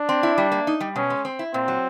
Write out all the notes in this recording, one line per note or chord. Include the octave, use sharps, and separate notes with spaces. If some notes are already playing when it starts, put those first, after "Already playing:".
Already playing: D4
C4
E4
G3
A#3
D#4
G3
B2 C#4
G#3
C4
E4
A#2 C4
F#3